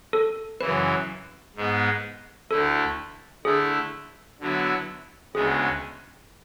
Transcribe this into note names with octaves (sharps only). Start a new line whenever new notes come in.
A4
F#2 C#3 E3 B4
G#2 G#3 B3
D2 D3 A3 E4 A4
D3 A3 E4 G#4
D3 F#3 B3 E4
D2 C#3 G#3 B3 G#4